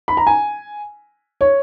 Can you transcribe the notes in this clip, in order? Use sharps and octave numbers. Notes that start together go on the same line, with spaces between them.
B5
A#5
G#5
C#5